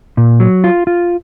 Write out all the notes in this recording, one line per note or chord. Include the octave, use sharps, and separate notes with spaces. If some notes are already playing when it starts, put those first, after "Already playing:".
A#2
F#3
F4
F4